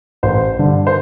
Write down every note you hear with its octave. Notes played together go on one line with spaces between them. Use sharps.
A1 C5
G2 D3
C5